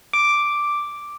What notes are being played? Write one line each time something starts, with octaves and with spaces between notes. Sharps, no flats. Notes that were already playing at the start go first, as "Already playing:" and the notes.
D6